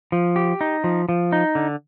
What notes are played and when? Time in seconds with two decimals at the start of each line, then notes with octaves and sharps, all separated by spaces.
0.12 F3
0.36 G4
0.61 D#4
0.84 F3
1.09 F3
1.32 D#4
1.55 D3